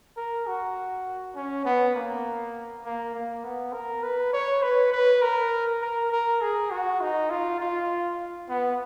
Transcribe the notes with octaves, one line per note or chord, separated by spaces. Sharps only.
A#4
F#4
C#4
B3
A#3
A#3
A#3
B3
A#4
B4
C#5
B4
B4
A#4
A#4
A#4
G#4
F#4
D#4
F4
F4
B3